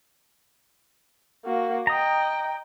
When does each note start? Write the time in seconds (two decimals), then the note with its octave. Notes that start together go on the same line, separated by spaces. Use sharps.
1.44 A#3 F#4
1.87 D#5 G5 A#5 D#6